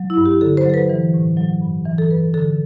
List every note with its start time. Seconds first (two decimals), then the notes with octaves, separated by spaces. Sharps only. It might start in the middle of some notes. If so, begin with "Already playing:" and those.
Already playing: F#3
0.10 E4
0.17 G2
0.26 G4
0.41 D3 A4
0.57 C5
0.66 F#3 A4
0.74 B4
0.89 E3
1.14 A2
1.37 F#3
1.61 G2
1.86 E3
1.98 A4
2.11 G2 B4
2.34 D3 A4